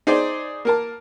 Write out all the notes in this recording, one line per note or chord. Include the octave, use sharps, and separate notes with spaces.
D#4 G#4 C5 D5
A#3 A#4 A5